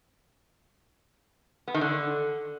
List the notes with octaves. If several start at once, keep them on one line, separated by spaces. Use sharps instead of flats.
B3
D#3
D3